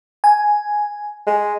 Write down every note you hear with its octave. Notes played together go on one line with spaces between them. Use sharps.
G#5
G#3